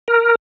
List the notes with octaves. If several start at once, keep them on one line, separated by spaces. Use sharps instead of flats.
A#4